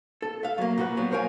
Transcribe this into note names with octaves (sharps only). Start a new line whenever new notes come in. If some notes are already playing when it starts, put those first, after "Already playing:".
A4
E5 F5
F#3 A#3
A#2 F#4 B4
F#3 G3 B3
A#4 C5 C#5 F5 G5 G#5